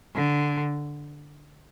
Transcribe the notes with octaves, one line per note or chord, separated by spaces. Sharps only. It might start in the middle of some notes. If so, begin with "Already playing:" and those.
D3